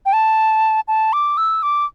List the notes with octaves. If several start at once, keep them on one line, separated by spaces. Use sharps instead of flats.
G5
A5
A5
D6
E6
D6